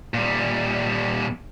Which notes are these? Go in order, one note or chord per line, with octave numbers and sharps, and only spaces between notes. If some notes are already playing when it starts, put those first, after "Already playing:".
A#2 G3